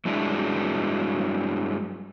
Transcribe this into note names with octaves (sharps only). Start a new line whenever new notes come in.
G2 F#3 G#3 D4 E4